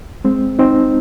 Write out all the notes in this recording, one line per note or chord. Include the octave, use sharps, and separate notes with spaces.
G#3 C4
C4 D#4